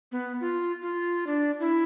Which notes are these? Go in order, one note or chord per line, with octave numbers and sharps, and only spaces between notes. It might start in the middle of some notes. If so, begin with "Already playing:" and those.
B3
F4
F4
D4
E4